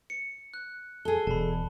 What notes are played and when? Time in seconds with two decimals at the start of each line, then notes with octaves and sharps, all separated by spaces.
0.10 C#7
0.54 F#6
1.05 G#4 A4 G7
1.27 E1 A5 B5